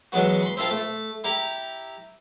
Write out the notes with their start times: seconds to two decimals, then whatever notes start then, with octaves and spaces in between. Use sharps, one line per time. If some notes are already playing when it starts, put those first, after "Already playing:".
0.12 E3 F#3 G#3 B3 F#4
0.42 B5 C6
0.57 C4 E4 F4 A4
0.71 A3
1.24 E4 G4 A#5